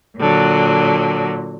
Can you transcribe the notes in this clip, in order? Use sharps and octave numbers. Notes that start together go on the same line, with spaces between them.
A#2 D3 F#3